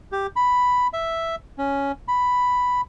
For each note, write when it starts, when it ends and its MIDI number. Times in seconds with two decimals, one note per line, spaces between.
0.12 0.27 67
0.36 0.87 83
0.93 1.35 76
1.58 1.92 61
2.08 2.81 83